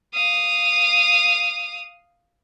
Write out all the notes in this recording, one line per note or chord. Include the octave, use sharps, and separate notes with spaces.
F5 D#6